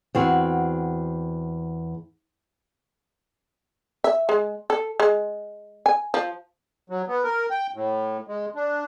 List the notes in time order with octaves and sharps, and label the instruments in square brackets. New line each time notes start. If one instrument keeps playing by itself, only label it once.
[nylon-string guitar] E2 C4 F#4
[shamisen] E5
G#3
A4
G#3
G#5
F3
[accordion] F#3
B3
A#4
G5
A2
G#3
D4